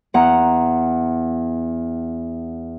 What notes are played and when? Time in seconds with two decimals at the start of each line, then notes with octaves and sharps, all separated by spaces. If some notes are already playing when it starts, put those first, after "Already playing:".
0.14 E2 F#5 A#5